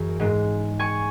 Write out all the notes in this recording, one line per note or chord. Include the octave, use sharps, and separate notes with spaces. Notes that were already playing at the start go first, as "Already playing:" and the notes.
Already playing: F#2 E3 G#4
G#2 G#3
G#5 C#6